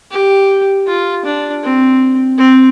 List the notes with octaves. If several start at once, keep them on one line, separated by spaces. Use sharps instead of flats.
G4
F4
D4
C4
C4